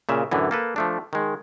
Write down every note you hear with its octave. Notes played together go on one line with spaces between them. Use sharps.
A#2 C#3 E5
F#2 A2 D3 E3
A#3 A4 B4
F3 A3 D4
D#3 G#3